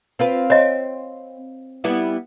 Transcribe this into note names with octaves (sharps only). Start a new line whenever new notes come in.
C4 F4 B4
C4 C#5 D#5
G3 B3 E4